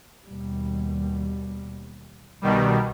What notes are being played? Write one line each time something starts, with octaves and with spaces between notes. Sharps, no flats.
D#2 B2 G3
C2 B2 D#3 G3